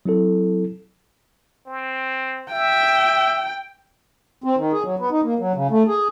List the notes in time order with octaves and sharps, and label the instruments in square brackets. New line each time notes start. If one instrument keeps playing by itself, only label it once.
[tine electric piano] F#3 C4 E4 A4
[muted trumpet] C4
[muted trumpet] E5 [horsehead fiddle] G5
[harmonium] C4
D#3
G#4
F#3
B3
D#4
A#3
F#3
C#3
A3
G#4